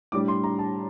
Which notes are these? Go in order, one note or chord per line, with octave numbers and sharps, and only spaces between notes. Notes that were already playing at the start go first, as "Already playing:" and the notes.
A2 G3 D4 D6
C6
A#5
A5